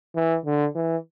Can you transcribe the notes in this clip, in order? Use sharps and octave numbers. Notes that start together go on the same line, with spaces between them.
E3
D3
E3